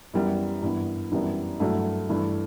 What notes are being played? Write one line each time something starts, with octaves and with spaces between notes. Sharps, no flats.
F#2 E3 G3 B3
G2 E3 B3
F#2 E3 G3 B3 D4
G2 F#3 A3 E4
G2 E3 A3